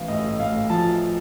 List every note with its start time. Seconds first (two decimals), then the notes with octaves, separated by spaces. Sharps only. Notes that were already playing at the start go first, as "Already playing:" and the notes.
Already playing: A1 F5
0.08 A2 D#5
0.39 A2 F5
0.70 F3 A5